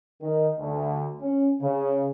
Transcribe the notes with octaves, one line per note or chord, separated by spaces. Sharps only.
D#3
D2
C#4
C#3